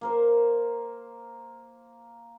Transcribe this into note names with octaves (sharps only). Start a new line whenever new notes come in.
A#3 A#4 C5